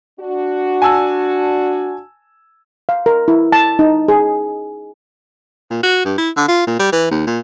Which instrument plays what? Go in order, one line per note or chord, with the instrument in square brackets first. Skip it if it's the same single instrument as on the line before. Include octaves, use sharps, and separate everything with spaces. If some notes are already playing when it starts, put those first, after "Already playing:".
[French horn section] D4 F#4
[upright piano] G#5 A5 E6
[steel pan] F5
A#4
E4
A5
D#4
G#4
[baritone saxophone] A#2
F#4
G2
E4
D3
F4
A#2
G3
E3
D#2
A#2